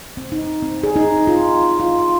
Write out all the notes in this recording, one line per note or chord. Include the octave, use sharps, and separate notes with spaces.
C4
D#4
C4
G#4
D#4
F4
F4